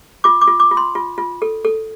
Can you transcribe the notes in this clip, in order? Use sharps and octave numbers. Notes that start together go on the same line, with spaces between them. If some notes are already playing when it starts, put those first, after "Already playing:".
F4 D6
D6
F4
D6
F4
C6
F4
F4
A4
A4